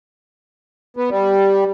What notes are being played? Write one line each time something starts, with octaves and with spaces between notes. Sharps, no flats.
B3
G3